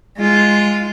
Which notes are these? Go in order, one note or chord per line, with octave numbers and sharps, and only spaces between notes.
G#3 F4